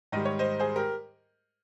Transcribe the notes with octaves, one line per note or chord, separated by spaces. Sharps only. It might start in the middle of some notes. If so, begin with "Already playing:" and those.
G#2 D#3 G3 D#5
C#5
C5 D#5
G#4 C5
G4 A#4